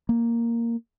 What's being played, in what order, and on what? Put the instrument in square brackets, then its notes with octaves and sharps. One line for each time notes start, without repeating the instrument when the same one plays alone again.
[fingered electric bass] A#3